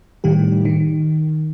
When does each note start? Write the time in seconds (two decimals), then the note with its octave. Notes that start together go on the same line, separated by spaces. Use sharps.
0.24 A2 D#3 G3 G4
0.65 D#3